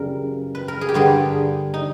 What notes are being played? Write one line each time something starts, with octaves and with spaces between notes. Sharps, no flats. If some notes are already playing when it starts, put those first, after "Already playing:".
Already playing: F#2 C#3 E3 G3 A#4
B4
A#4
G#4
G4
G2 D3 G3 G#4
D#4